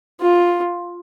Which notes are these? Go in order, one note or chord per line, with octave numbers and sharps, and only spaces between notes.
F4